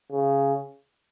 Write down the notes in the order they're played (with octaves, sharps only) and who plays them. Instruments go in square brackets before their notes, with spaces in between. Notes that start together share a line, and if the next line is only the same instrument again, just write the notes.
[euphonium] C#3